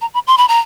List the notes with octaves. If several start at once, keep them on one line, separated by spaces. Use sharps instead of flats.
A#5
B5
C6
B5
A#5